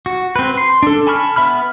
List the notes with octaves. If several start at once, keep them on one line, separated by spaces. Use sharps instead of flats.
F#4
C4 B4
C6
D4 A4
G#5 A5 B5 C#6 F6
B3 E5 B5 F6